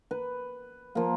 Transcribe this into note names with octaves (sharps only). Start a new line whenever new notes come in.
B4
F3 A#3